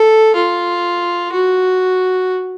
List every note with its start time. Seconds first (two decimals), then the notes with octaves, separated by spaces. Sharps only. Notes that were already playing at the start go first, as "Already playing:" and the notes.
Already playing: A4
0.35 F4
1.32 F#4